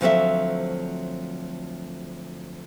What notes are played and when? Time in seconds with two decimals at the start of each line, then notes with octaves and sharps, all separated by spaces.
0.01 D2 F3 F#3 C4 A4 E5